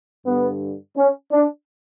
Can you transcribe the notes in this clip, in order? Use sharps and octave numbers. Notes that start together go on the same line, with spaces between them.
G2 D3 B3
C#4
D4